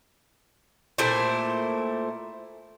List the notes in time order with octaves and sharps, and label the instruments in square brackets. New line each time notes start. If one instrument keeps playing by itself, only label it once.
[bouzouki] A#2 A3 E4 C5